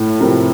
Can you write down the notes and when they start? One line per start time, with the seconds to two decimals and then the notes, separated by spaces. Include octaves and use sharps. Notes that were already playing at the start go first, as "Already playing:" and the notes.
Already playing: A2
0.20 C3 F3 C4 G4 A#4